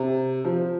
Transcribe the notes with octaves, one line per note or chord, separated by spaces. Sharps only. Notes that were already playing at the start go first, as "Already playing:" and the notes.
Already playing: C3
F3